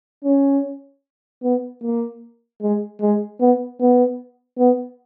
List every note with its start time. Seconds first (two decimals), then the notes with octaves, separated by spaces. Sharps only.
0.24 C#4
1.43 B3
1.82 A#3
2.62 G#3
3.01 G#3
3.40 B3
3.80 B3
4.59 B3